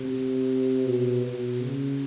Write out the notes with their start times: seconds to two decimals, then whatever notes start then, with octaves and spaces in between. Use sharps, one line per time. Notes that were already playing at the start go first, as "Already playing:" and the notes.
Already playing: C3
0.85 B2
1.23 B2
1.61 C#3